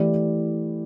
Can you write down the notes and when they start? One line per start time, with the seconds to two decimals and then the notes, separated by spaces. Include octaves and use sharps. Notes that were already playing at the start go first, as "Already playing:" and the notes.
Already playing: E3 A3 E4 G4 D5